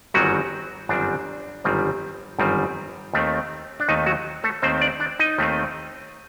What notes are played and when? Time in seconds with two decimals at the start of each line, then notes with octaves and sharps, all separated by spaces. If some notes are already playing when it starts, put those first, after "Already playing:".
0.14 G1 F#2 D#3 F#3 G3 C4 F#4
0.89 G1 F#2 D#3 G3 C4 D4
1.64 G1 F#2 D#3 G3 C4
2.39 G1 F#2 D#3 G3 C4
3.13 D#2 D#3 A3 C4
3.80 D4
3.88 D#2 D#3 A3 C4 D#4
4.06 F#3 F#4
4.44 A3 A4
4.62 D#2 D#3 A3 C4 C5
4.81 D4 D5
5.00 D4 D5
5.19 D#4 D#5
5.38 D#2 D#3 A3 C4